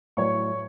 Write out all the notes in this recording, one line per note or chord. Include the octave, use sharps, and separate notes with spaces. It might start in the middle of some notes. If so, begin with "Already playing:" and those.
A2 F#3 C#5 C#6